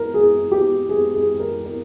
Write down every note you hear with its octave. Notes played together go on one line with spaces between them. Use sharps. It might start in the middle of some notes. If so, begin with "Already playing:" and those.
Already playing: A#4
G#4
G4
G#4
G#4
A#4
A#4